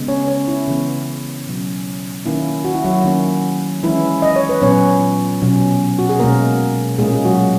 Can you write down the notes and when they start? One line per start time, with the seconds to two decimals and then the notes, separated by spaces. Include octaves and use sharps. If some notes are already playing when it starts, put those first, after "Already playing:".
Already playing: C#3 G#3 B3
0.08 C#4 C#5
0.28 C#4 C#5
0.48 E4
0.68 C#3 E3 B3
1.47 B2 F#3 C#4
2.26 D#3 A#3 C#4 E4
2.65 F#4
2.75 E4
2.84 F#3 F#4
3.04 D#3 A#3 C#4
3.83 E3 G#3 C#4 E4
4.22 D#5
4.36 C#5
4.49 B4
4.62 A#2 F#3 B3 C#4 C#5
5.42 B2 F#3 C#4
5.99 F#4
6.09 G#4
6.19 B2 G#3 A#3 C#4 A#4
6.98 A#2 G#3 A#3 C#4 G#4
7.15 G#4
7.25 F#3 F#4